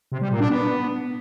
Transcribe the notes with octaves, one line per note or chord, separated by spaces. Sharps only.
C3
G3
A#2
D4
B3